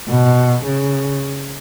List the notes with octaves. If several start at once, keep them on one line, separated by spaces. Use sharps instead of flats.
B2
C#3